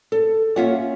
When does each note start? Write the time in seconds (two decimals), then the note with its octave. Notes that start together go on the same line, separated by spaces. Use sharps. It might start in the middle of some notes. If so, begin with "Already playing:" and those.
0.12 A4
0.56 A#3 C#4 F4 C#5 E5 F#5